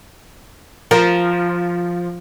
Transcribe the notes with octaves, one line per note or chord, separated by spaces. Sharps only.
F3 A#4